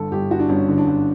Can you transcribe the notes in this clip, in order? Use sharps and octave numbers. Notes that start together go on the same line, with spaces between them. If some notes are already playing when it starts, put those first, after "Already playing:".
Already playing: G1 D3 A4
G1 G4
G1 F#4
D4
G1 C#4
D3
D4
G1